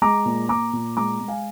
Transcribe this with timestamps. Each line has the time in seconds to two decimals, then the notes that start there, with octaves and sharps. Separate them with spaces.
0.02 G#3 A#5 D6
0.26 A#2
0.49 A#2 A#5 D6
0.73 A#2
0.97 G#3 A#5 D6
1.20 G#3
1.28 F5 G#5